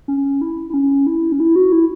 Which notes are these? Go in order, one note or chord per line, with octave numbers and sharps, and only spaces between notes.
C#4
E4
E4
C#4
E4
C#4
E4
F#4
E4